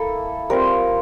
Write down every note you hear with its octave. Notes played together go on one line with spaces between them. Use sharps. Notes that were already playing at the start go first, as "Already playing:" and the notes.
Already playing: A#3 E4 A4
G3 C4 F4 A#4